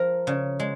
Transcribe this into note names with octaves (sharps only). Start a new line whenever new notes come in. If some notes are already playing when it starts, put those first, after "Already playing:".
Already playing: F3 A#4
C#3
G#3